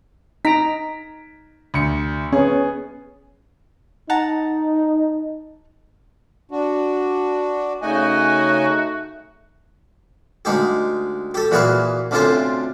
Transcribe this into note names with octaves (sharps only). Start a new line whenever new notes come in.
D#4 A#5 B6 D7
D2 C#7
B3 C#4 G#4
D#4 F#5 A5 A#5
D4 F#4
C#3 A3 D#4 F#4 D#5 G#5
D2 G#3 D#4 G4
G4 A4
A#2 E3 F#4 G#4 B4 F5
D2 C3 C#4 F4 A4 C5